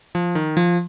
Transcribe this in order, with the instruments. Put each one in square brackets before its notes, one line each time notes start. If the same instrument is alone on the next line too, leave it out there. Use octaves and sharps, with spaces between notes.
[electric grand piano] F3
D#3
F3